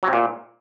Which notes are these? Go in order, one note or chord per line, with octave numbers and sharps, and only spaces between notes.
F#3
C3
A#2